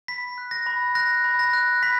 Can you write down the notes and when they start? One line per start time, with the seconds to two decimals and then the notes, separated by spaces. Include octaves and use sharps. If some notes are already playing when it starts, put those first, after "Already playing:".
0.08 B5 B6
0.38 F#6
0.51 A#6
0.66 B5
0.95 F#6 A#6
1.24 B5
1.39 A#6
1.53 F#6
1.83 B5 B6